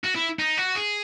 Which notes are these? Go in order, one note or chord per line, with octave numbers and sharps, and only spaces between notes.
F#4
E4
D#4
F#4
G#4